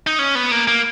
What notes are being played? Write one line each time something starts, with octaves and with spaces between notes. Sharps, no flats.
D#4
C#4
B3
A#3
A#3